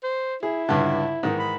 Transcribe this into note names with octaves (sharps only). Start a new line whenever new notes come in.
C5
E4 G#4
C#2 G2 D3
G#2 D#3 E3
B5